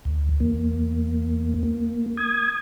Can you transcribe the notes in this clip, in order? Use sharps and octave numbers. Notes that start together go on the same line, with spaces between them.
D2
E2 A#3
A#3
D#6 G#6